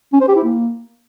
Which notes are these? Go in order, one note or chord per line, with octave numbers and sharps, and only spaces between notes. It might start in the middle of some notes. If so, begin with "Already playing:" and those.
C#4
C5
G4
E4
A#3